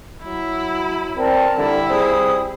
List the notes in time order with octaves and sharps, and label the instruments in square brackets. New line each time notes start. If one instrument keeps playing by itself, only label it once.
[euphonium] F#3 [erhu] E4
[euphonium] C4 [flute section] A#4 D5 A5
[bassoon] D3 [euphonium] G3 [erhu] E4
[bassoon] C4 [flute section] G#4 D#6